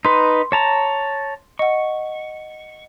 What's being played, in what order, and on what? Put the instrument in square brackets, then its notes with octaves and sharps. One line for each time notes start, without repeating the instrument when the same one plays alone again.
[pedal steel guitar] D#4 B4 [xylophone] C6
[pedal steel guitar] C#5 A5 A#5
[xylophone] D#5 F#5 [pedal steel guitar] C#6